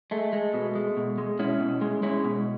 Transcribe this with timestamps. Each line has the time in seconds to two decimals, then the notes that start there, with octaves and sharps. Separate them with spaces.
0.11 G#3 A3
0.33 G#3
0.54 B2
0.75 G#3
0.97 B2
1.18 G#3
1.39 B2 C#4 E4
1.60 B2
1.81 G#3
2.03 G#3 C#4 E4
2.24 B2